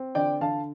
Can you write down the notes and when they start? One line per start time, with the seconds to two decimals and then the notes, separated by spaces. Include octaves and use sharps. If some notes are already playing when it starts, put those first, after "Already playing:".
Already playing: C4
0.15 D3 D5 G5
0.41 D3 F5 A5